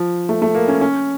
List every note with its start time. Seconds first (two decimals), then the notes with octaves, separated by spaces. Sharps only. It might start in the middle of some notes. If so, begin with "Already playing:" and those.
Already playing: F3
0.29 A3
0.42 A3
0.55 A#3
0.68 C#4
0.81 C#4